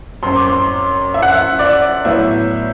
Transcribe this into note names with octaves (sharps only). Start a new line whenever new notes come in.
F#2 F#3 C4 C6
D6
C6
E5
F#5
E5
D5
A2 F#3 B3 E5